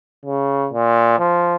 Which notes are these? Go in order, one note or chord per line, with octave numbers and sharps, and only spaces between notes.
C#3
A#2
F3